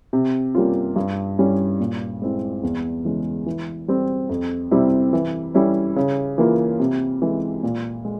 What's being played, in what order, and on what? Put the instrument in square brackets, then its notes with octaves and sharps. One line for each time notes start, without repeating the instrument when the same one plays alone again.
[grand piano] C3
G3 A#3 C#4 F4
G2
G3 C#4 E4
A#2
G#3 C4 E4
E2
C#3 E3 G#3
E3
G3 C4
F2
C3 G3 C4 E4
E3
G3 C#4 E4
C#3
E3 A#3 F4
C3
E3 G#3
A#2
G#3